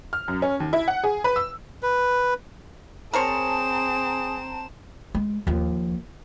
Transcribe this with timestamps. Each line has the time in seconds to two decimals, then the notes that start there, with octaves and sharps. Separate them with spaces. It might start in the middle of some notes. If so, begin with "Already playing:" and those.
0.13 F6
0.28 F#2
0.42 C#4
0.60 D#2
0.73 E4
0.88 F#5
1.04 G#4
1.24 B4
1.36 E6
1.83 B4
3.14 C4 G#4 A#4 C5 C#5 A5 A#5 E7
5.15 G#3
5.47 D#2 F3